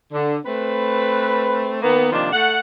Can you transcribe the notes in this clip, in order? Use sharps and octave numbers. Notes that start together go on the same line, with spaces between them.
D3
A3 C4 B4
D#3 A#3 B3
C3 D#3 F3 A#3 D4
A3 F#5